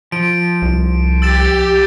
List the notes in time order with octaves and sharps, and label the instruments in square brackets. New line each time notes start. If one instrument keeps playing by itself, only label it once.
[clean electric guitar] F3 [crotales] D7
[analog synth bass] C2
[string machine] G4 [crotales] E6 A6 E7